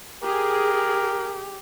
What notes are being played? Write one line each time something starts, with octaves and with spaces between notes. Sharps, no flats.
G4 G#4 A#4